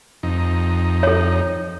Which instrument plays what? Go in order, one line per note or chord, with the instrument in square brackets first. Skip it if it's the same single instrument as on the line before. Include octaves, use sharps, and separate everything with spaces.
[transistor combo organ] F2 D#4
[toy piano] A4 C#5